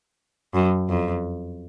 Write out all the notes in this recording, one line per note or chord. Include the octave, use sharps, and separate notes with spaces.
F#2
F2